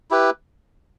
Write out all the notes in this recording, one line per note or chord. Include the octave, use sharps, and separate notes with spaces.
E4 G4 B4